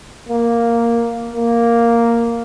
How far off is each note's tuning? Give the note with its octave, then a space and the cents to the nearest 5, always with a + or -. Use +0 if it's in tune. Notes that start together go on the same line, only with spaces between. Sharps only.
A#3 +0
A#3 +0